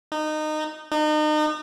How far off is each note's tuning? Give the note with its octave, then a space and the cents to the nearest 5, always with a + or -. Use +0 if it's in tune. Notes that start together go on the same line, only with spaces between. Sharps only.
D#4 -20
D#4 -35